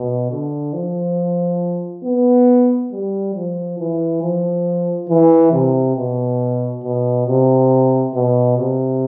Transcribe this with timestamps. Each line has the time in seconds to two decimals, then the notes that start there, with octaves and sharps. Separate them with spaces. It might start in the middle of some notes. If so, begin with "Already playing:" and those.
Already playing: B2
0.31 D3
0.74 F3
2.04 B3
2.92 G3
3.35 F3
3.79 E3
4.22 F3
5.09 E3
5.52 C3
5.96 B2
6.83 B2
7.27 C3
8.14 B2
8.58 C3